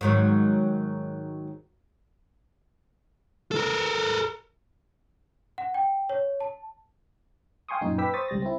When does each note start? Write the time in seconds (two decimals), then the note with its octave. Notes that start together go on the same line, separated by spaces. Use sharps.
0.01 G#2 D#3 F#3
3.52 A4 A#4
5.58 F#5
5.74 G5
6.09 C#5
6.40 A5
7.69 F5 G5 G#5 C6 C#6 D#6
7.81 F#2 A#2 D#4
7.98 B4 G5 D6 E6 B6
8.14 C5 C#6 D#6 A6
8.28 C#2 G3 A6 A#6
8.42 C4 E4